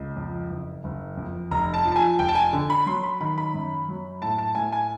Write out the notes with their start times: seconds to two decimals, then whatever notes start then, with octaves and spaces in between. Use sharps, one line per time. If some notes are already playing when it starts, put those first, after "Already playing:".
Already playing: C#2
0.16 F2
0.50 F#1
0.84 F#1
1.17 F2
1.51 F1 A#5
1.74 A5
1.85 F3
1.92 A5
1.96 G#5
2.19 F1 G5
2.28 A5
2.35 G#5
2.53 D3
2.70 B5
2.86 F#3 C6
3.03 B5
3.21 D#3 B5
3.38 B5
3.54 F#2
3.88 F#3
4.22 A2 A5
4.38 A5
4.55 A2 G#5
4.72 G#5